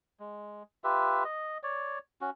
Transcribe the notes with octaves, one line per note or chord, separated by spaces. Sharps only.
G#3
F4 G4 B4 E5
D#5
C#5 D5
C#4 F#4